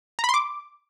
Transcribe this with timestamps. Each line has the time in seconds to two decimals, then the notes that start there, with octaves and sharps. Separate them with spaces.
0.19 A#5
0.24 B5
0.29 C6
0.34 D6